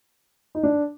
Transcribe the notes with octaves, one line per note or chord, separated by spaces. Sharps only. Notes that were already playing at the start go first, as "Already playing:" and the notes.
D#4
D4